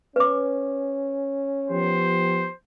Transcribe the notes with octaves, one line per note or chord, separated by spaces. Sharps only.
C#4 B4 D6
F3 B3 G4 C5